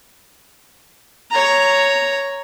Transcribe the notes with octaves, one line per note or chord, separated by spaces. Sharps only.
C#5 A#5